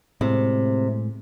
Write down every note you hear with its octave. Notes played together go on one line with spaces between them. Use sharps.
A2 C3 G#3